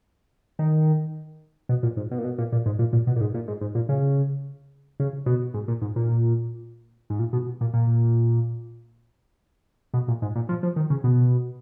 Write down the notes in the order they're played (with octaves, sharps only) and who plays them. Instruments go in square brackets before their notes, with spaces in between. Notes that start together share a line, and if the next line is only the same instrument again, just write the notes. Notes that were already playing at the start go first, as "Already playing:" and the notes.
[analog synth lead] D#3
B2
A#2
G#2
B2
A#2
B2
A#2
A#2
G#2
A#2
A#2
B2
A#2
G#2
A#2
G#2
G#2
A#2
C#3
C#3
B2
G#2
A#2
G#2
A#2
G#2
A#2
B2
A#2
A#2
B2
A#2
G#2
A#2
F3
F3
D#3
C#3
B2